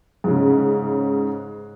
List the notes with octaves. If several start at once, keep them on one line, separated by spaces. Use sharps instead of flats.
G#2 C#3